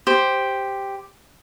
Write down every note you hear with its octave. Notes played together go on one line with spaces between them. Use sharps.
G4 C5